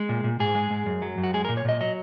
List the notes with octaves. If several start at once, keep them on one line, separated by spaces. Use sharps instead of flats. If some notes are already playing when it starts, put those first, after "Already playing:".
Already playing: G#3
A#2
A#2
G#2 G#4
G#3
G#2
F#2
F#3
F#2
F#4
G#3 G#4
A#4
A#2
C#5
A#2 D#5
F#3 D#5